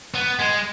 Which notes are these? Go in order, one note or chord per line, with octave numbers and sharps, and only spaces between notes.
B3
G#3